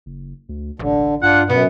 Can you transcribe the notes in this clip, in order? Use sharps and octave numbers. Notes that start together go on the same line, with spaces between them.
F#1
D2
E1 A1 D3
G2 D4 F4 F#5
F#2 B2 B3